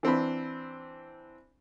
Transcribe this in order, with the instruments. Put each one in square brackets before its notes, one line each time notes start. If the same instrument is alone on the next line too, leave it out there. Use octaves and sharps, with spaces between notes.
[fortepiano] E3 C4 D4 B5